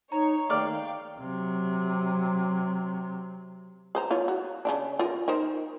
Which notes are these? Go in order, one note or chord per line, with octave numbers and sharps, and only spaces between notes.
D#4 C#5 A#5
D#3 D5 F5 G5 D6 F6
C3 F#3
G#4 C5 A#5
E4 F4 C#5
F#4
C#3 E3 D4
F4 A#4
D#4 A#4 C5